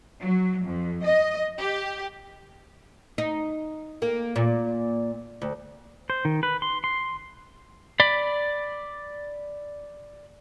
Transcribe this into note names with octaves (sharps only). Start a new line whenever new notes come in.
F#3
F2
D#5
G4
D#4
A#3
A#2
D2
C5
D#3
B4
C6
C6
D5 B5